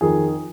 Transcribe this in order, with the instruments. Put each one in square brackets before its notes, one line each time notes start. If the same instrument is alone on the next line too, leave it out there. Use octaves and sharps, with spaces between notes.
[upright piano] F2 D#3 G#4